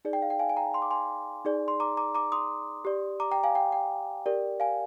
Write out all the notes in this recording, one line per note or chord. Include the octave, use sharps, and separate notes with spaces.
D#4 G#4 D5
G5
F5
G5
F5 G#5
G#5
G5 A#5
C6
D6
G#5 C6
D#4 G#4 D5
C6
A#5 D6
A#5 D6
A#5 D6
C6 D#6
G4 D5
A#5 D6
G5 A#5
F5 G#5
G5
G5
G4 A#4 D5
F5 G#5